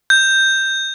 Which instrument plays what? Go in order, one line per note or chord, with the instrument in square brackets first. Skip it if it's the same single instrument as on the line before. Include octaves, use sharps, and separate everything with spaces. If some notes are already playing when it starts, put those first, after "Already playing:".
[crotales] G6